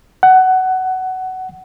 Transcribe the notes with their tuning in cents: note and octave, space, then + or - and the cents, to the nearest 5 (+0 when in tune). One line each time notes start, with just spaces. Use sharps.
F#5 +15